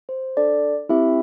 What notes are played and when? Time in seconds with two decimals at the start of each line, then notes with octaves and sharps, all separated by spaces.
0.09 C5
0.37 D4 A4 D5
0.89 C4 E4 G4 E5